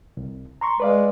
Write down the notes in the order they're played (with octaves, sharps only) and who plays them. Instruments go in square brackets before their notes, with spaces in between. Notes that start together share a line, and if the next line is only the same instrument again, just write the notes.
[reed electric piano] C2
A#5 C6 C#6
[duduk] G#3 [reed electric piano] B4 D5 F5